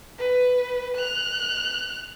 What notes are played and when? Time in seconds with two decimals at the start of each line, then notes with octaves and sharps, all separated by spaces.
0.18 B4
0.97 F#6 F7